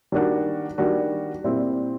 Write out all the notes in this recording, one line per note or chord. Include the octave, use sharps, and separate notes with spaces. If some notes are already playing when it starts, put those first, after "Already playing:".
D#3 G3 A#3 D4 F#4
D#3 G3 A#3 D4 F#4
A#2 G3 C4 E4